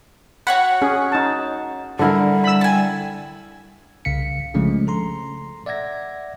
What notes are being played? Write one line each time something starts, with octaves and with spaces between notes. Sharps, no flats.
F#4 C#5 F#5 B5
C#4 G#4
D#4 A5
D3 G3 E4 A#4
B5 E6
G#5 A5
C2 C#3 F5 B6 C#7
C#3 F3 G#3 A3 C#4 D4
A4 A#5 C6
D5 E5 F#5 G#6 A#6